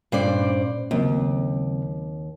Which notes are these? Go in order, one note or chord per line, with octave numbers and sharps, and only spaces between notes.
G2 A#2 C#4 C5 D5
D#2 C#3 F#3 C4